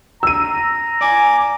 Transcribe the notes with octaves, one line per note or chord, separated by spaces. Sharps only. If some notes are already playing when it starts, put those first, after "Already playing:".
A#5 E6 D#7
D5 G#5 D6